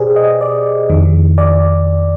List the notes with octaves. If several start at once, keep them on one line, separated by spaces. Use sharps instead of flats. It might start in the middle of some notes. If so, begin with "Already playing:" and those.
Already playing: B2 G4 G#4 B4 C5 D5
D#5
D5
F2 D#3
D5